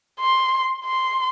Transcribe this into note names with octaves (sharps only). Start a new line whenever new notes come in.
C6
C6